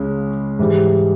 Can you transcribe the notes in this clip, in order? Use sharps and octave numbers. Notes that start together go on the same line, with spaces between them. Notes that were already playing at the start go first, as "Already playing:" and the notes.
Already playing: C#2 C#3 G#3 C#4
G#2 E3 G3